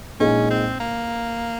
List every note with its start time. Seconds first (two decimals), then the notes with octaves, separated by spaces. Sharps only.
0.20 A#1 A#2 G#3 C#4 D#4 G#4
0.50 C4
0.80 A#3